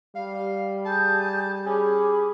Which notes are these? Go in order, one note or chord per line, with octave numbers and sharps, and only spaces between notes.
G3 F5
G#4 G#5 A5 G6
C#4 G#4 B5 D6